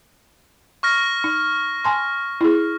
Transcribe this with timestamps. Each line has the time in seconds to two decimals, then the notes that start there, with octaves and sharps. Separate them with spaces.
0.83 C#6 F6 A#6
1.24 D#4
1.85 G#5 A5 C6
2.41 E4 G#4